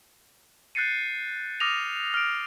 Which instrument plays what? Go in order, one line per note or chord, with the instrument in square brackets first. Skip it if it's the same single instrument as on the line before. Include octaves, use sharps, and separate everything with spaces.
[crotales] F#6 G6 A6 C7 C#7 D#7
D6 D#6 F6 A#6 D#7 F7
F6 D7